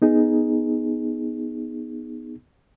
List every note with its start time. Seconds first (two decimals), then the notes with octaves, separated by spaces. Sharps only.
0.02 B3 D#4 G#4